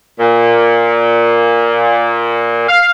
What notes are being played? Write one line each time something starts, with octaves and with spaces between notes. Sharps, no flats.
A#2
F5